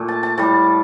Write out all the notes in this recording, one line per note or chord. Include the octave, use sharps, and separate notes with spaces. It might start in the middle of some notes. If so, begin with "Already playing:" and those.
Already playing: A#2 A3
A5
A5
A2 G3 A5